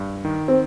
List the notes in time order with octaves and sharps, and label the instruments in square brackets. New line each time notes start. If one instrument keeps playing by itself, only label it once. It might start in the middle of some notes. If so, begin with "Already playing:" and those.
Already playing: [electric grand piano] G2
D#3
[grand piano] C4